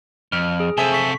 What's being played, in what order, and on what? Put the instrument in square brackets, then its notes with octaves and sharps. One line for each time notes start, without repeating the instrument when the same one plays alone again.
[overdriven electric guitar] F2 [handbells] F6
[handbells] G#4
[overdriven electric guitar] C3 A4 [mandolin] C5 E5 G#5
[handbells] C#6 B6